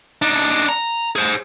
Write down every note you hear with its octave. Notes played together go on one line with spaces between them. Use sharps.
D4 D#4
A#5
G#4 C5